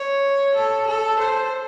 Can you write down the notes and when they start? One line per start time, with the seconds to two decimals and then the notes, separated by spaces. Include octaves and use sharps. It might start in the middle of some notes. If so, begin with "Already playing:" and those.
Already playing: C#5
0.55 A4
0.87 A4
1.20 C5